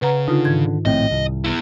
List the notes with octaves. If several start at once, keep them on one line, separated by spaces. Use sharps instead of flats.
C#3 B4 F#5 A#5
D3 D#4 F4
G#2 D#3 G#6
A#1 A2 C4 D#5
C2
B3 E4